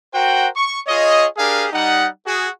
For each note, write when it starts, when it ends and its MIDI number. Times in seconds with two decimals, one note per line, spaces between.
0.14 0.47 66
0.14 0.47 70
0.14 0.47 72
0.14 0.47 78
0.14 0.47 79
0.56 0.79 85
0.87 1.26 65
0.87 1.26 68
0.87 1.26 73
0.87 1.26 75
1.37 1.67 62
1.37 1.67 67
1.37 1.67 68
1.37 1.67 70
1.37 1.67 77
1.37 1.67 80
1.73 2.07 55
1.73 2.07 63
1.73 2.07 78
2.26 2.48 66
2.26 2.48 68